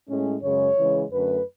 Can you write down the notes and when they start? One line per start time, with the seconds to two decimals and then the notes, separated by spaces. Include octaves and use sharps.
0.08 A2 G#3 C#4
0.42 F#2 C#3 G#3 C#5
0.77 C#3 E3 G#3
1.12 F#2 D3 A3 B4